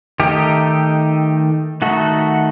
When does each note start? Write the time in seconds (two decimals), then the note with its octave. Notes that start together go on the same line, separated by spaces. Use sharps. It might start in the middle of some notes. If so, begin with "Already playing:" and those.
0.20 D#3 A3 D#4 G4
1.82 D#3 A3 D#4 F#4